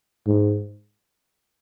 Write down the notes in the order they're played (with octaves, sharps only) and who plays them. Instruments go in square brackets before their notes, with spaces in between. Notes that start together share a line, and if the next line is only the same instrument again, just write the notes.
[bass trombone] G#2